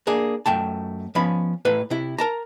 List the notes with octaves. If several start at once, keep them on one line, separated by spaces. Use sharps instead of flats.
A#3 D4 G#4
F#2 A3 G5 A5
F3 B3 C#4 B5
A2 A3 B4
C3 E4
A#4 A5 A#5